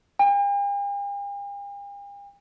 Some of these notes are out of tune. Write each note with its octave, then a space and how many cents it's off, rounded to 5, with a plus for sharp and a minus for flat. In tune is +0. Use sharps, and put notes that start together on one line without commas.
G5 +45